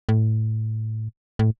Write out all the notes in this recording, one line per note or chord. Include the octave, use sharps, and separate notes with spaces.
A2
A2